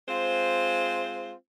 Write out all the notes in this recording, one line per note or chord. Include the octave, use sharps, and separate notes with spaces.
G#3 C4 F4 C5